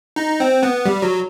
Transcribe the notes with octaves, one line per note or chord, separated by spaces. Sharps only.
D#4
C4
B3
G3
F#3